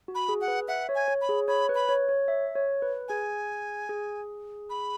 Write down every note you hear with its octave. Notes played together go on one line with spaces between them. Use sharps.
F#4
B5
G#4
F#5
B4
E5 F#5
C#5
G#5
C#5
B5
G#4
C#5 B5
B4
B5
C#5
C#5
E5
C#5
B4
G#4 G#5
G#4
B5